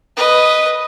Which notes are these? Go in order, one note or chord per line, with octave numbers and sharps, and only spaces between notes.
B4 D#5